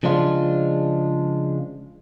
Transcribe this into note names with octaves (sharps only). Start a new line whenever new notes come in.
C#3 F3 G#3 D4 F4